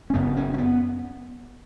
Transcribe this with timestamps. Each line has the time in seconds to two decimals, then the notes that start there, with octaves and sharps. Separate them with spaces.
0.10 C#4
0.14 F#1 F#2 C#3 B3
0.37 C#4
0.54 C#4
0.58 B3